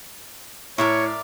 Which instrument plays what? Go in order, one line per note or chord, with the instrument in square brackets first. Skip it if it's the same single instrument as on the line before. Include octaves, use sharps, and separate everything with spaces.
[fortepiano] A2 [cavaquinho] A#4 D5 E5 [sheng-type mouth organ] C#5 C#6